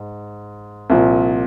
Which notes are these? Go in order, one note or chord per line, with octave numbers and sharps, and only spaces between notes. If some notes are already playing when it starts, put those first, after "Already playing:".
Already playing: G#2
C2 A#2 F3